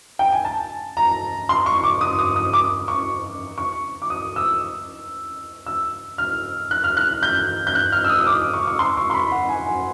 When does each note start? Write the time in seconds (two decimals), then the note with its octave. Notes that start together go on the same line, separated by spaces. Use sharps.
0.19 G5
0.32 G#5
0.45 A5
0.97 A#5
1.49 C6
1.66 C#6
1.84 D6
2.01 D#6
2.19 D#6
2.36 D#6
2.53 D6
2.88 C#6
3.58 C#6
4.02 D6
4.10 D#6
4.36 E6
5.66 E6
6.18 F6
6.71 F#6
6.84 F6
6.97 F#6
7.23 G6
7.67 G6
7.75 F#6
7.92 F6
8.04 E6
8.09 D#6
8.20 D#6
8.27 D6
8.53 C#6
8.67 C#6
8.79 C6
8.97 C#6
9.10 C6
9.14 B5
9.32 F#5
9.49 G#5
9.66 G#5